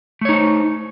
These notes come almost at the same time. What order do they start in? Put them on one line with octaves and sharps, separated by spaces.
A3 C#5 D#4 C5